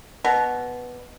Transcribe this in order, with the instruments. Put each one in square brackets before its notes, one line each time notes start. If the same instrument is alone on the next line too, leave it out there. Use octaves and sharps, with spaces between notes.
[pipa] B2